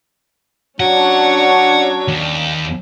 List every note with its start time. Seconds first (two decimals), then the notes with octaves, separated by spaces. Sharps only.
0.80 F#3 C#4 D4 C#5 F#5
2.08 D#2